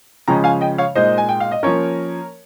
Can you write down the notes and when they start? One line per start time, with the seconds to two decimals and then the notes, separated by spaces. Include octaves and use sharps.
0.28 C#3 F3 G#3 C#4 G5 A#5
0.44 F5 G#5
0.61 D#5 G5
0.78 C#5 F5
0.95 A#2 G#3 D#4 C5 D#5
1.18 G#5
1.29 G5
1.40 F5
1.51 D#5
1.63 F3 A#3 C#4 A#4 C#5